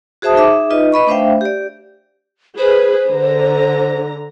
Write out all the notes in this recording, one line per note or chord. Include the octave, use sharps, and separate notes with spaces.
F#4 G#4 C5 E5 A5 D#6
D#4 G#4 E5 D6
D#4 F4 B4 D#5
B4 D#5 B5 C#6
A3 D4 C5 E5 F5 G5
G4 D5
G#4 B4 C5
D3 A#5